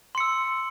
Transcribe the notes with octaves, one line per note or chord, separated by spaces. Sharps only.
C6 E6 C#7